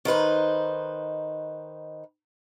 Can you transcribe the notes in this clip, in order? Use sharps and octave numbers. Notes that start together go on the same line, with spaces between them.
D#3 D#4 B4 C5